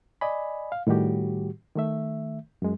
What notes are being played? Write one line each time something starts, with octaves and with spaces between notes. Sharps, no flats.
D5 D#5 G#5 B5
F5
A2 D#3 G3 F#4 G4
D#3 A3 E5
F#2 G#3